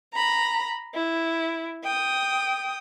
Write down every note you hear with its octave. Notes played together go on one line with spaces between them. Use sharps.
A#5 B5
E4
G5 D#6